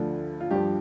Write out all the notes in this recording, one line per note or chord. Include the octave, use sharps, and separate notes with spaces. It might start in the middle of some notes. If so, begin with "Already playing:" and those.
Already playing: D2 D3 F3
F4
G2 F3 G4